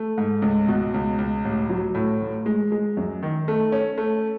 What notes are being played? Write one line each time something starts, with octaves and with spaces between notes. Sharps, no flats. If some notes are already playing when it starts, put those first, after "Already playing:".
Already playing: A3
G#2
C#2
B2
C#2
C#2
A1
F#3
A2
A1
G#3
G#3
F#2
D#3
A3
C#4
A3